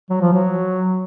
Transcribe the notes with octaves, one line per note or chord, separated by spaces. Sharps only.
F#3
F3
F#3